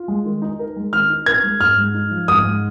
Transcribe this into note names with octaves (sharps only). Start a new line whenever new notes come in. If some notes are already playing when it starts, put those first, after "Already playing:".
Already playing: F4
G#3
D#3
D#4
A#4
G#3
D#3 F6
D#4
A#4 G#6
G#3
G#2 F6
G#3
D#4
F3
G#2 D#6
G#3